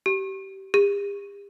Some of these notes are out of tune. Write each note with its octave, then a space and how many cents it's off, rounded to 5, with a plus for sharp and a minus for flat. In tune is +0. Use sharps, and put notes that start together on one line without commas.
G4 -25
G4 +45